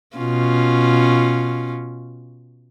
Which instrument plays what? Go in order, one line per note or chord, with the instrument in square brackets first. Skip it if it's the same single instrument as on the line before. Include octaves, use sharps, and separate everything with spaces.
[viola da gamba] B2 C#4 F4